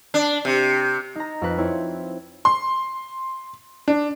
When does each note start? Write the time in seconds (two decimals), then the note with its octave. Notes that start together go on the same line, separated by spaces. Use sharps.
0.14 D4
0.45 C3
1.15 D#4 A#5
1.42 F2 B4
1.58 C4 E4 C#5
2.45 C6
3.88 D4